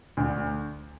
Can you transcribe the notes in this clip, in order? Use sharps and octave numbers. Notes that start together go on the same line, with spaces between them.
D2